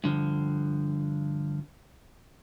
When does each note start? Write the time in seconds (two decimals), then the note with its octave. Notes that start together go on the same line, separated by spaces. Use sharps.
0.04 G2 D3 F3